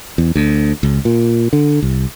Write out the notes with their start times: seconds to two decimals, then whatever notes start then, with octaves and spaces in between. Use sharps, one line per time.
0.18 E2
0.35 D2
0.83 C#2
1.05 A#2
1.53 D3
1.82 C2